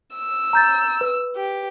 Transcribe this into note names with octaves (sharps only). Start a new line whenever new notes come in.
E6
A#5 G6 A6
B4
G4